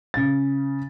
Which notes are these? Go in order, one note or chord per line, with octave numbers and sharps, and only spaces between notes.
C#3 A6